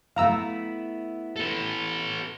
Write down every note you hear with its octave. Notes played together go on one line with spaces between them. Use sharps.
A3 B3 E4 F5 A#5 E6
A4 B4